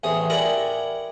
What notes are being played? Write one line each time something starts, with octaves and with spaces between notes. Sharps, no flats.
A1 E2 C3 G#4 D#6
E4 G4 A#4 D5 F#5 G#5